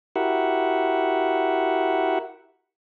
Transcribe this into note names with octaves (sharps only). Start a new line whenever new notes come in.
E4 F#4 G4 A#4 E5 F#5